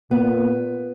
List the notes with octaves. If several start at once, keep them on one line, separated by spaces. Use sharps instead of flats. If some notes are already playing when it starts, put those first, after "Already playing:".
A#2 B3